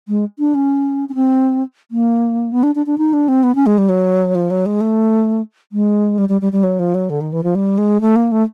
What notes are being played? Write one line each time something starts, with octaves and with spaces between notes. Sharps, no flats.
G#3
D4
C#4
C#4
C4
A#3
B3
D4
D4
D4
D#4
D4
C4
B3
C#4
G#3
G3
F#3
F3
F#3
G#3
A3
G#3
G3
G3
G3
G3
F#3
F3
F#3
D3
D#3
E3
F3
G3
G#3
A3
A#3
A3